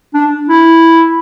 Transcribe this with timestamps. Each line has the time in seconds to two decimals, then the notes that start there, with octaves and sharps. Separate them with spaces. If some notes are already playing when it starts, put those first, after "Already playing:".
0.14 D4
0.49 E4